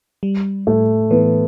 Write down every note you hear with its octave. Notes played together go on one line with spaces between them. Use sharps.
G3
A2 A3
E3 B3